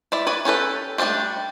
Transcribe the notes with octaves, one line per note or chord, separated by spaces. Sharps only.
E4 D5 E5
B4 C#5 D5
C#4 G4 A4 B4
G3 A3 C4 D4 G4